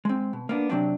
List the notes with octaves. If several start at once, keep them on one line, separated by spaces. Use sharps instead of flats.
G#3 C4
B2
A#3 B3 D4
C3 F#3 C4 D4